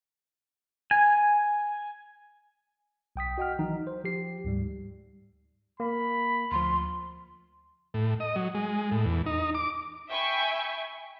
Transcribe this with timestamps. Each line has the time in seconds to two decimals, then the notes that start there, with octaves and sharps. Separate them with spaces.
0.91 G#5
3.16 B1 G5 D#6 B6
3.38 F#4 D#5 F#5 G5 F6
3.59 D#3 E3 F#3 D#4
3.87 C5
4.04 F3 G4 C7
4.44 D2 G#2 G3
5.80 A#3 B5
6.52 D2 F3 C6
7.94 A2
8.20 D#5
8.36 F#3
8.55 G#3
8.92 A2
9.06 E2
9.26 D#4
9.55 D6
10.10 E5 G5 G#5 B5 C#6 G6